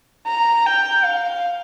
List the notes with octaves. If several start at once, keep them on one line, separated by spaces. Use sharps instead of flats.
A#5
G5
F5